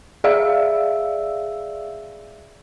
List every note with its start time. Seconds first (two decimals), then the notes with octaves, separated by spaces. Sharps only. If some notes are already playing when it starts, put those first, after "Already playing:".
0.24 G#4 D5 E5 F5 E6